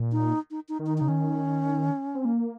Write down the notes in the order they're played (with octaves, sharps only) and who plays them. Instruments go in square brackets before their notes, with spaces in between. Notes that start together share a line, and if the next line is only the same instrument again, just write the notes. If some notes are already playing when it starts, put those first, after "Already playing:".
Already playing: [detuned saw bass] A#2
[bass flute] D#4
D#4
D#4
[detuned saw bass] D#3
[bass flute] D#4
[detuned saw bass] C#3 [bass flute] D#4
[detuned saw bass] D#3 [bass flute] C#4
[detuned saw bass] C4
A#3